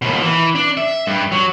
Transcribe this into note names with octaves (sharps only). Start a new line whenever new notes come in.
D#2 B2
E3
D4
E5
G2
F#3